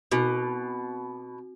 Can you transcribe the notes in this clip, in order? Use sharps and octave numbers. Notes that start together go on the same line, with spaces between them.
B2 C4 F#4